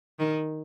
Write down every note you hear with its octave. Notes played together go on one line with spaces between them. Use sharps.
D#3